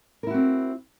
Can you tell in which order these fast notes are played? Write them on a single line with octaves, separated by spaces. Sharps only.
A#4 E4 F#4 C4